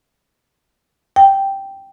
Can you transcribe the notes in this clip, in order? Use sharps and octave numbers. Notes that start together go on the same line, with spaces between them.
G5